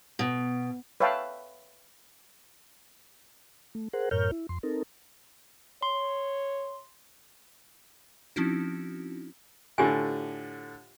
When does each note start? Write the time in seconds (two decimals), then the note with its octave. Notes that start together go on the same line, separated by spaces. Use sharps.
0.19 B2
1.00 B4 C#5 E5 F5 G5 A5
3.75 A3
3.93 G#4 A#4 C5 F#5
4.11 F#2 A2 A#4 C#5 F6 G6
4.32 E4
4.49 F2 C6
4.63 C4 D#4 A4 A#4
5.83 C#5 C6
8.36 F3 C4 C#4 D#4 E4 F#4
9.78 A2 D3 F4 G4 G#5